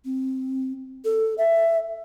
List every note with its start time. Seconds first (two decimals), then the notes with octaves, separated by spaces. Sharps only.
0.05 C4
1.05 A4
1.38 E5